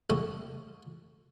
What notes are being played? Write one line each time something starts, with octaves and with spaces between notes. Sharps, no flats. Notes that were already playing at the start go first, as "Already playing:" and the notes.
C2 A3 A4 C#6 D#6